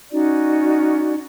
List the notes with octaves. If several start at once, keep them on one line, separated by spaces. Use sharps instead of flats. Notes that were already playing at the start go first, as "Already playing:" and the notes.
C#4 D#4 F#4 D5